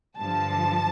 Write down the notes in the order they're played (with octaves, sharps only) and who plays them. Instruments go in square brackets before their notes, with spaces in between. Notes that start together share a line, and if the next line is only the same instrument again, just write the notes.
[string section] G2 D3 F3 A5